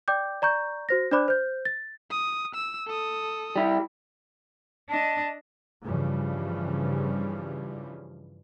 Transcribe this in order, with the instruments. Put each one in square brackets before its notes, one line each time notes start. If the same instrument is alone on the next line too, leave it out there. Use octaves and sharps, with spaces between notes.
[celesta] D5 G5 D6 G6
D5 A#5 C#6 G6
F#4 C5 A#6
D4 C5 D5 B5 D6 F#6
C5 G6
A6
[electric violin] D#6
E6
A4 D#6
[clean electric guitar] G3 E4
[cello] D4 D#5 [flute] A5
[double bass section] G2 C#3 E3 F3 G3